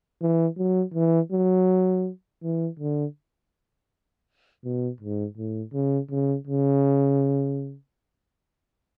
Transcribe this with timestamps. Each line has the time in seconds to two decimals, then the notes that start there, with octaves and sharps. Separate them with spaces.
0.21 E3
0.57 F#3
0.94 E3
1.32 F#3
2.43 E3
2.79 D3
4.64 B2
5.00 G#2
5.37 A2
5.73 C#3
6.11 C#3
6.47 C#3